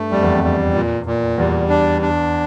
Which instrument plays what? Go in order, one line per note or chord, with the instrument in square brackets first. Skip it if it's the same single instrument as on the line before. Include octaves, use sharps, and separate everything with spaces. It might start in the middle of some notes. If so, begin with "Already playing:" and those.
Already playing: [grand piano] G2 [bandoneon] A3
[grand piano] F2 [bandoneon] G3
[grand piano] E2
F2
[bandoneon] G3
A#2
A#2
[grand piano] E2 [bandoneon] G3
[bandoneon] D4
D4